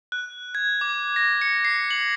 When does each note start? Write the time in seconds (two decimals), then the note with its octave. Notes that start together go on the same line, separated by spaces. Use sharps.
0.12 F#6
0.55 G#6
0.81 D6
1.16 A#6
1.41 C#7
1.65 C7
1.91 F#7